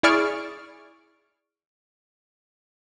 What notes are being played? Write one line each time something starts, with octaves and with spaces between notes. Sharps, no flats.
E4 G#4 D5 C#6 F6 D7